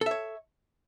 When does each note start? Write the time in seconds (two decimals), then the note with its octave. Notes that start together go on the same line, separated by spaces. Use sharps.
0.01 A4
0.06 E5
0.11 C#5